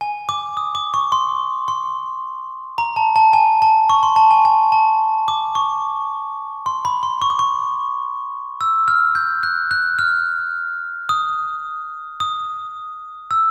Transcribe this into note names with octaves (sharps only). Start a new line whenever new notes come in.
G#5
D6
D#6
D6
C#6
C6
C6
A#5
A5
A5
G#5
A5
C#6
C6
A5
G#5
G#5
A5
D6
C#6
C6
B5
C6
C#6
D6
C#6
E6
F6
G6
F#6
F#6
F6
D#6
D#6
E6